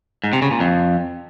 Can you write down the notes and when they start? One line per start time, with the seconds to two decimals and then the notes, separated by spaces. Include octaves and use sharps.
0.24 G#2
0.33 C3
0.42 C#3
0.51 A#2
0.60 F2